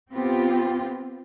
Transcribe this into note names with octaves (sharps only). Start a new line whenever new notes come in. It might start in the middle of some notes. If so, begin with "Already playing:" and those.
B3 C4 F4 G4